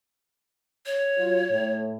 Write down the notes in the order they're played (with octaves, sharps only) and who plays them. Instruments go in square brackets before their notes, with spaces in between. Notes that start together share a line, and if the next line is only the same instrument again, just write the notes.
[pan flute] C#5
[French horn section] F#3 F4
A2